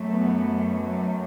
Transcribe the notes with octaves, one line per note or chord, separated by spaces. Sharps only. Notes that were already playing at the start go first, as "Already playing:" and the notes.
Already playing: F#2 F#3 A3
B3
A3